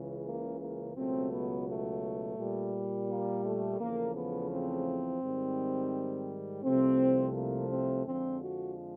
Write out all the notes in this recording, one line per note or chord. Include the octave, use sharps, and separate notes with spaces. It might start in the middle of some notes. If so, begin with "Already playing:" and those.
Already playing: C#2 C#3 E3
A#3
A#3
C#2 B2 F#3 A3 C4
B3
A3
A#2 G3
A#3
A3
E2 C#3 F3 A3 A#3
B3
C4
G#2 D#3 G3
C2 C3 F3 A3 C4
A#3
C4
F2 D3 F3 G#3 C4
F#4